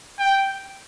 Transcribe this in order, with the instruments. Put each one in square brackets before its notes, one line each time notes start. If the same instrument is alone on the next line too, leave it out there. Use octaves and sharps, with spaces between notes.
[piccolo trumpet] G5